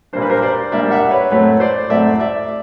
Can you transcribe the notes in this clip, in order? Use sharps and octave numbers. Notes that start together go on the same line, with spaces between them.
A#2 G3 A#3 D4 C5
B4
A#4 C5
C5 D5
A#2 G3 A#3 D4 D5 E5
E5 F#5
B4 C#5
A2 F#3 A3 C4 B4 C#5
C5 D5
A2 F#3 A3 C4 D5 E5
D5 E5